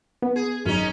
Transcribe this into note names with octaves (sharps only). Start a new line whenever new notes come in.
B3
G#4
G#1 F#2 C#4 D#4